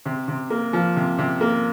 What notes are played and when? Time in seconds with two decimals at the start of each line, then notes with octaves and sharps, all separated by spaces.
0.06 C3
0.28 C3
0.50 A#3
0.73 F3
0.96 C3
1.18 C3
1.41 A#3